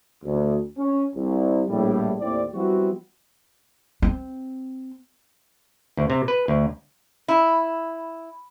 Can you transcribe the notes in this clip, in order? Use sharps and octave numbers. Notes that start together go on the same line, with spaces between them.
D2
C#4
C2
A#1 A2 G3
D#2 A2 C4 D5
F3 G3 B3 C4 E4 F#4
C4
D2
C3
B4
D2
E4